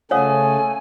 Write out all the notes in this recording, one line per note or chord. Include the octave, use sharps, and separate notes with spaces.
C#3 A3 A4 C#5 F5 F#5 G#5 D#6